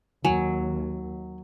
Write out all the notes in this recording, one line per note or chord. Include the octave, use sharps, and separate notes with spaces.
D#2 F#3 G#5